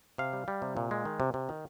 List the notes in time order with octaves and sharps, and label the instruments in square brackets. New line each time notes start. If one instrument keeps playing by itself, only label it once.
[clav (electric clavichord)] C3 F5
G3
G3
C3
A#2
G#3
D#3
C3
C3
D#3